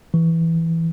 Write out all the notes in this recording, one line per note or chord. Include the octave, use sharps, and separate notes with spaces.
E3